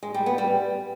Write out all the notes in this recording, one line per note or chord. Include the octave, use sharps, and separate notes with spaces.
G#3
G3
B3
G3